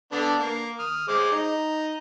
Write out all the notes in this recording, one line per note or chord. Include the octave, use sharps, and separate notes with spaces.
D3 B3 D4
A#3
D#6 F6
G#3 C5 D6
D#4